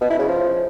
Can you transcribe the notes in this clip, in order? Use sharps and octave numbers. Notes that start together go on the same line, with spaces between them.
B2
E4
C#3
F3